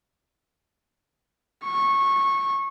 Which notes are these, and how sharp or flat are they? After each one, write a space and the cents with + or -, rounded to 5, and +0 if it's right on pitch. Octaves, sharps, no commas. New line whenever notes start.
C#6 -20